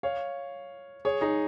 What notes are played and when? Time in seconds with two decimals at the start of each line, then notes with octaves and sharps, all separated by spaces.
0.03 C#5 F5
1.05 G#4 C#5
1.21 D#4 G#4